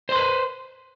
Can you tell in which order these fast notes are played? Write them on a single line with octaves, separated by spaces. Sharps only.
C5 C6 B4